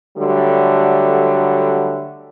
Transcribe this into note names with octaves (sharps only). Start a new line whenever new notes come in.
D3 F#3 G3 A3